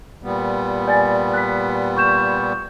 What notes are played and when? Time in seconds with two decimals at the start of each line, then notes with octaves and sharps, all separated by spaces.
0.23 A#2 G3 B3
0.88 D5 G#5 A6
1.34 F#6 B6
1.97 C#6 G6 E7